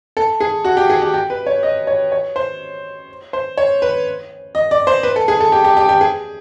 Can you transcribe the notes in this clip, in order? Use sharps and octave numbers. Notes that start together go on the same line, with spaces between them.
A4
G#4
F#4
G4
G#4
G4
G4
B4
C#5
D#5
C#5
C#5
C5
C5
C#5
B4
D#5
D5
C5
B4
A4
G#4
A4
G4
G4
G4
G4
G#4